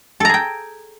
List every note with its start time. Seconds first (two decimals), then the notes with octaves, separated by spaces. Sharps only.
0.20 A4
0.25 A#5
0.29 G#4
0.34 G5